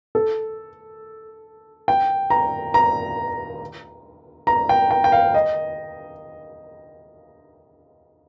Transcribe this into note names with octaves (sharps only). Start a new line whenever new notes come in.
A4
G5
A#5
A#5
A#5
G5
G5
G5
F5
D#5